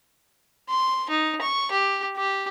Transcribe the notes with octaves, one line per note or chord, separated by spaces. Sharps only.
C6
D#4
C#6
G4
G4